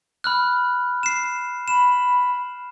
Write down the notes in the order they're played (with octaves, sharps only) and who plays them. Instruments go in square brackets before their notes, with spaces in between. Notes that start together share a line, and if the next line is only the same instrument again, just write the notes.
[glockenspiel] B5 F6 F#6
C7 E7
[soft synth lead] B5 [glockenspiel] E7